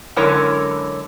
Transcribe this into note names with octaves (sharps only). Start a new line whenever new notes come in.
F#2 D3 G#3 E4 A#4 C#5